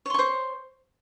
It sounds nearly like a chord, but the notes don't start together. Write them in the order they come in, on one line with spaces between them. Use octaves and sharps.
C#5 C6 C#6 C5